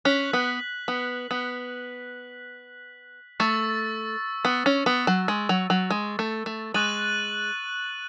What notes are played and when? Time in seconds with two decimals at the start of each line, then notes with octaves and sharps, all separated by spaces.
0.05 C#4 F#6 B6 F#7
0.33 B3
0.88 B3
1.31 B3
3.40 A3 C#6 E6 A6
4.45 B3
4.66 C#4
4.86 B3
5.07 F#3
5.28 G#3
5.49 F#3
5.70 F#3
5.90 G#3
6.19 A3
6.46 A3
6.74 G#3 C#6 F#6 A6 D#7 F#7